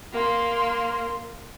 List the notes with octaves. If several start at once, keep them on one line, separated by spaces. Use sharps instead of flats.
A#3 C6